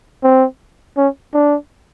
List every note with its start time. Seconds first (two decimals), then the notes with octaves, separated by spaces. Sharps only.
0.23 C4
0.97 C#4
1.34 D4